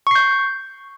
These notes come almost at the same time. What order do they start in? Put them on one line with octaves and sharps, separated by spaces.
C#6 C7 G6